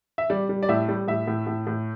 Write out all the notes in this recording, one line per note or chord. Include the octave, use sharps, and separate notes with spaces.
E5
G3 D5
G3
D5
A2 E5
G3
A2 E5
A2
A2
A2